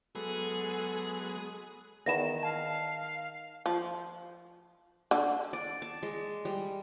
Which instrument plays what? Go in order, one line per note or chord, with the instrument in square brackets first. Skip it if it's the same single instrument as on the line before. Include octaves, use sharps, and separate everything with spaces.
[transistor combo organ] F#3 G#3 B3 [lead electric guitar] G#4 [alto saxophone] A4
[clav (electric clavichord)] E2 B3 [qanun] D#3 [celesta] A#6 E7
[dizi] F5 [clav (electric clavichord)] G#5 [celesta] A5
[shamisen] F3
D3
[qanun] D5
A5
G#3
G3